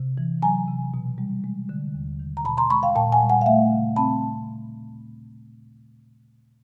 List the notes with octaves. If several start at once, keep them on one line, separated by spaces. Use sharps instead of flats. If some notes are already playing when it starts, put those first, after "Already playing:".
Already playing: C3
E3
F#3 G#5 A#5
C3
B2
G3
G#3
D3
D#2
D#3
A#5
B2 A5 B5
A#5 C6
G#3 B5 C#6
F5 G5
A#2 G5 A5
F#5 G#5
G3
F#5 G#5
F5
A3 E5 F#5
C#3
C4 A5 B5